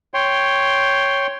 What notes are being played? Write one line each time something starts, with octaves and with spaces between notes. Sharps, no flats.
C#5 G5 C6